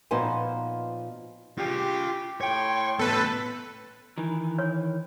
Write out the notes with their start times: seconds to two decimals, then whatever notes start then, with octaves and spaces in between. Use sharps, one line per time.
0.11 A#2 F3 B3 D#4 C5 G#5
1.58 F4 G4 G#4
2.41 A2 C#5 G5 C6
2.99 A2 B3 A4 B4
4.18 D#3 E3
4.59 C#5